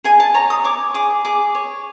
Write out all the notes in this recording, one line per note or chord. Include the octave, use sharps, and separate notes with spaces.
G#4 G#5
A5
C#5 A#5
D#6
C#5 D6
G#4 D6
G#4 D6
C#5